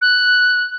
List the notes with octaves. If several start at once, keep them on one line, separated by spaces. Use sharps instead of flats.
F#6